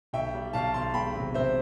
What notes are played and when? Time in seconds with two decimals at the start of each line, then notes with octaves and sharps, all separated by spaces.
0.13 B1 E5 G5
0.34 G3
0.53 B1 F5 A5
0.74 B1 A5 C6
0.94 E1 G5 B5
1.15 C3
1.34 C3 C5 E5